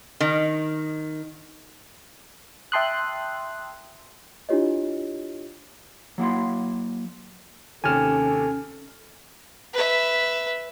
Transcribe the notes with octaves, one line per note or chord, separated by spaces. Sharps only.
D#3
E5 G5 A5 C6 D#6 F#6
D4 E4 F4 G4 C#5 D#5
F#3 A#3 E4 C6
D#2 C3 C#4 A4 G#5 F6 E7
B4 E5